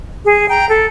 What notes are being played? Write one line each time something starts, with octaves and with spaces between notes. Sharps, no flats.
G#4
G5 A#5
A4